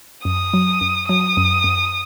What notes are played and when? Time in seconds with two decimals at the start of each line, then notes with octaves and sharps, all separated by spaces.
0.25 F#2 D#6
0.53 F#3
0.81 F#2
1.09 F#3 D#6
1.37 F#2
1.64 F#2